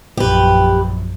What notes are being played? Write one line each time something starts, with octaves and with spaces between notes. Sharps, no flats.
A#1 F#2 G4 B4